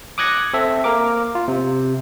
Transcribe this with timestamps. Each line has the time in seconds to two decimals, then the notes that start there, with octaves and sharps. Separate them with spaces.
0.18 D6 D#6 F#6 G#6 A#6 C#7
0.54 C4 A4 E5
0.84 A#3 A#4 D6
1.35 F4
1.48 C3